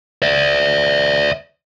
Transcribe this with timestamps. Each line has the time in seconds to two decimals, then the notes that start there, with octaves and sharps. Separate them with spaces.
0.23 D5 E5